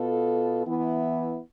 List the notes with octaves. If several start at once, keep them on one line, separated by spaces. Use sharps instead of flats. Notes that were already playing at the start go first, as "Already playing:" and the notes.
Already playing: B2 B3 F4 A4
E3 B3 E4